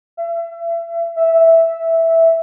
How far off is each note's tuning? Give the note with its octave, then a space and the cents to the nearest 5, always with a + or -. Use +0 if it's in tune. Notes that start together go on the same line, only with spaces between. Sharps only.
E5 +35
E5 -5